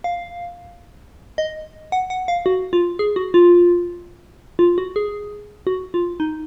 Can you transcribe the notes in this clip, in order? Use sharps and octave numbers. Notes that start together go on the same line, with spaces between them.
F5
D#5
F#5
F#5
F5
F#4
F4
G#4
F#4
F4
F4
F#4
G#4
F#4
F4
D#4